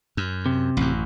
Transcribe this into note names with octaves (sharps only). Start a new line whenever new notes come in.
F#2
C3
A1 F#2